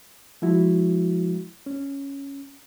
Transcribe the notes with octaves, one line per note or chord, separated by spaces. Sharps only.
F3 G#3 E4 F#4
C#4